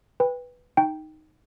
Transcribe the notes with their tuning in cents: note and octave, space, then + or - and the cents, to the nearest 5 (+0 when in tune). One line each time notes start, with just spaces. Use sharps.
B4 +0 G5 +25
D#4 +0 G5 +0